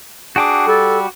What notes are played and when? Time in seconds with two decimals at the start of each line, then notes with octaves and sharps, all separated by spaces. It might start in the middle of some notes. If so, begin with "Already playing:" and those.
0.36 D4 F#4 G#4 G5 D6
0.67 G3 A4